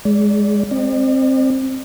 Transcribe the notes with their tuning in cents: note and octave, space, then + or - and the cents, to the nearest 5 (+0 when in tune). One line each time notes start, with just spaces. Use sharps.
G#3 +0 D5 -30
C4 +10 D5 +40